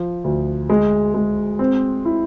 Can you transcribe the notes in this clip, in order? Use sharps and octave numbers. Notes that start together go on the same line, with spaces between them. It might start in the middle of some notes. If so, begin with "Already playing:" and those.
Already playing: F3
D2
G#3
G#3
C4
E4